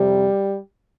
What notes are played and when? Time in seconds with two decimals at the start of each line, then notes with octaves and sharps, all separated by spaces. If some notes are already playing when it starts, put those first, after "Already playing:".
Already playing: F2 C3 G3